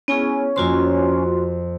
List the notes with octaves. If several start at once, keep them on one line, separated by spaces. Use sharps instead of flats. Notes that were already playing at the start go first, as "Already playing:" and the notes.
B3 C#4 E4 G#4
F2 A#3 F4 F#4 C5 C6